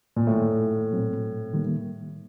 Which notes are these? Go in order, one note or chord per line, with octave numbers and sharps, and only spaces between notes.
A#2
F#2 A2 D#3 F#3 A3
A#2 F#3 C4
D#3 G3 A#3